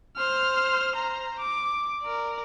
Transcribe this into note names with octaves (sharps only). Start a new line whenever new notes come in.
C5 F6
C5 A#5
D6
A#4 D5